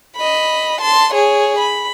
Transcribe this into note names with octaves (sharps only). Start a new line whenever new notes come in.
D#5 B5
A5 C6
G#4 C#5
B5